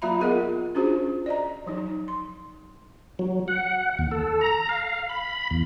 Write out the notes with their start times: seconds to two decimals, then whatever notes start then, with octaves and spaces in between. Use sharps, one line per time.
0.02 F#3 A#3 F4 E5 A#5 B5
0.20 B3 F4 G#4 A#4 D#5 F#5
0.75 C#4 D4 F4 F#4 G#4 C5
1.26 D5 D#5 A#5
1.66 F3 F#3 D#4
2.08 C6
3.19 F#3
3.48 F#5
3.99 D#2
4.11 A4
4.41 A#5
4.69 F5
5.09 B5
5.51 E2